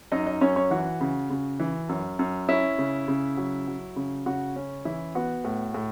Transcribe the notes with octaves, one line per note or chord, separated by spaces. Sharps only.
F#2 D#4 D#5
D#4 D#5
F#2 C#4 C#5
C#4 C#5
E3 F#4
C#3
C#3
E3
F#2
F#2
C#4 E4
C#3
C#3
F#3
F#3
C#3
C#3 F#4
C#4
E3 E4
B3 F#4
A2
A2